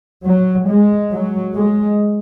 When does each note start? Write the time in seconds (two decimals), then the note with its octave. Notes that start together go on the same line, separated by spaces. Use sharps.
0.24 F#3
0.67 G#3
1.11 F#3
1.55 G#3